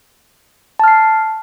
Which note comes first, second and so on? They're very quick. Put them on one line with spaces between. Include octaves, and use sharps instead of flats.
A5 F6 C7